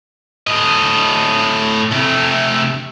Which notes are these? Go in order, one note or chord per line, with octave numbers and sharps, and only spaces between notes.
A2 D#5
C3 A3